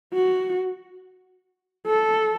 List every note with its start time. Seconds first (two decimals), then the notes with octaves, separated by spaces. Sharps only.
0.14 F#4
1.87 A4